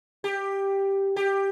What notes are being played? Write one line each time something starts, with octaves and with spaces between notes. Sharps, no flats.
G4
G4